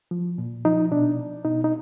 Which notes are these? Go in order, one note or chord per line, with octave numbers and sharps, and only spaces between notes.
F3
A#2
F3 D#4
B2 D4
B2 D#4
D#4